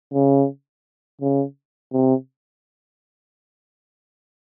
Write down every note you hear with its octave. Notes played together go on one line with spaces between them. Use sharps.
C#3
C#3
C3